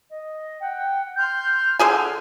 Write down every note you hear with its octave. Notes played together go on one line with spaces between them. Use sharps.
D#5
F#5 G5
C6 F6 G6
D3 G#4 G#5 F6